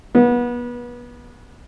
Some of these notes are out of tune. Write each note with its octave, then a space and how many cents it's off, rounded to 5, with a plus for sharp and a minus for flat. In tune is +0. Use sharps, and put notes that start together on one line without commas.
B3 -30